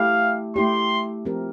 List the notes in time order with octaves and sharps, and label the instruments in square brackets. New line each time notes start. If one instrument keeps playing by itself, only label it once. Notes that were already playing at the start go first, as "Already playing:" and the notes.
Already playing: [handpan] A3 E4 G4 [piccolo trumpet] F5
[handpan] A3 E4 G4 [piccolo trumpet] C6
[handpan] F3 C4 G4 A#4